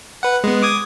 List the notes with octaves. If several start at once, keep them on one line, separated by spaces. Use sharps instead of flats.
B4 F#5
G#3 B3
D6 D#6 G#6